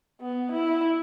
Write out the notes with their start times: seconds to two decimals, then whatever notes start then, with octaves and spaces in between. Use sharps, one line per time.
0.21 B3
0.52 E4